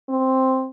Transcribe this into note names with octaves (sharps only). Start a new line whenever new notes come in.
C4